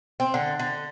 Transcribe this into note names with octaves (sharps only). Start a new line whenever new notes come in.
C4
D3
D3